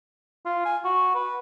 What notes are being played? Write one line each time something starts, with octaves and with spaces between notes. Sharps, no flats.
F4
G#5
F#4
B4